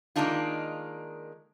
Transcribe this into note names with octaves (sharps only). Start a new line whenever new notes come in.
D#3 G#3 A#3 D4 D#4 F4